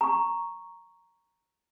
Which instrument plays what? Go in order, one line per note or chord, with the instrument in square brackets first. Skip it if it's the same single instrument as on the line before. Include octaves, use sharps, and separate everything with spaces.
[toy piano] A#5 C#6